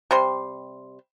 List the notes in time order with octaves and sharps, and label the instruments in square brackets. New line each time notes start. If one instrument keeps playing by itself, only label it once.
[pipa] C3 G3 C6